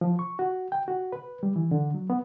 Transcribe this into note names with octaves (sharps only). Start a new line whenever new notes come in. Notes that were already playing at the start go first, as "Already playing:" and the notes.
F3
C#6
F#4
G5
F#4
B4
G3
E3
D3
F#3
B3